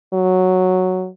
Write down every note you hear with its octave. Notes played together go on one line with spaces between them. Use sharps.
F#3